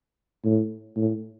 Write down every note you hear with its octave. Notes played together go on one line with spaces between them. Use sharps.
A2
A2